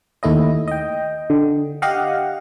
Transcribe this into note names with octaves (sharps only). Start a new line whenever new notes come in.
D#2 A3 E4 D#5
D#5 G5
D3
G4 D#5 F5 F#5